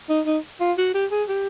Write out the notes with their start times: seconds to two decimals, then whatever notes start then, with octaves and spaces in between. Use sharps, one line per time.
0.09 D#4
0.26 D#4
0.60 F4
0.78 F#4
0.94 G4
1.11 G#4
1.29 G4